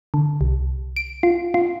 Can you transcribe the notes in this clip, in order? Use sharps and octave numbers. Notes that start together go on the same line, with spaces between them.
D3
C2
D7
F4
F4